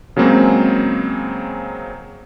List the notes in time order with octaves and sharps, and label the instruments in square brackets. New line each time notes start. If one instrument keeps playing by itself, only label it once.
[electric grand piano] C#3 F#3 G#3 A#3 C4 C#4